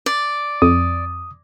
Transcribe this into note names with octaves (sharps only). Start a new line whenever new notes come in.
D5
F2 D#6